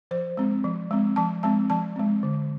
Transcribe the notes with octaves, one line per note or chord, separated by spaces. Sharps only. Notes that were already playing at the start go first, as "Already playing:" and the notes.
F3 C5
G#3 C4
F3
G#3 C4
F3 A5
G#3 C4 A5
F3 A5
G#3 C4
D3